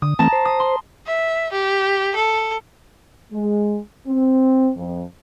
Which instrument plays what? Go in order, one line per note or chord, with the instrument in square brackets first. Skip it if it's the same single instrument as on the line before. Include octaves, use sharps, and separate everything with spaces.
[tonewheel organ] D3 [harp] D#6
[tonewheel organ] E3 A3 C4 [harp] A5 A#5
[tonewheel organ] C5
[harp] D#6
C6
[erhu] E5
G4
A4
[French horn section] G#3
C4
F2